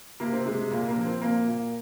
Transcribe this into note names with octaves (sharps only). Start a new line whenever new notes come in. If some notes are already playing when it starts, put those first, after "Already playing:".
C3 A#3
C4
C3 G#3
G#3
A#2 A#3
A#3
F3
C4
A#2 A#3
A#2